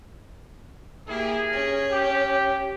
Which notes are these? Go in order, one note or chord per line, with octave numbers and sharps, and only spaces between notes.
A#3 E4 G4 G#4 A#4
C#4
G4